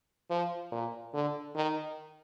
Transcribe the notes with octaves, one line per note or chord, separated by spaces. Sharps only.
F3
A#2
D3
D#3